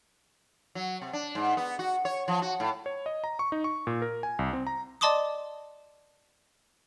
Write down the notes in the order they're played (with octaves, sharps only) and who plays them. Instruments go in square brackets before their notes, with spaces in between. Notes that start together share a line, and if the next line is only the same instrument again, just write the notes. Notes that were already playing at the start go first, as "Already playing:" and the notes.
[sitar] F#3
C3
D4
G#2
B3
F#4
C#5
F3
F#4
A2
[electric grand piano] C#5
D#5
A#5
C#6
D#4
C#6
A#2
A#4
G#5
C2
C4
A#5
[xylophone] D5 D#5 A5 C6 D6 D#6